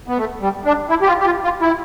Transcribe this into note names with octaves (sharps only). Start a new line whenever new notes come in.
B3
A3
G3
D4
E4
G4
F4
G4
F4
F4
E4